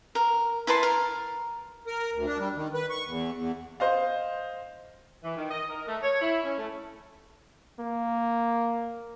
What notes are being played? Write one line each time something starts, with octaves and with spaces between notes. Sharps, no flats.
A#4
E4 B4 A5 C6
A#4
A#4
D2
D4
G3
D#3
B4
C#6
E2
E2
C5 D#5 F5
E3
D#3
D#5
A#4
A3
C#5
E4
C#4
A3
A#3